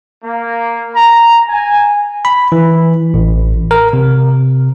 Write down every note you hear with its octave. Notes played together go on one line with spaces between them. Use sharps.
A#3
A#5
G#5
B5
E3
A1
A#4
C3